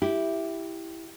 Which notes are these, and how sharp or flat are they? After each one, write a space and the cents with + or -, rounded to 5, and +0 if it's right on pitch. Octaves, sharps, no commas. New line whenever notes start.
E4 +0 G4 +0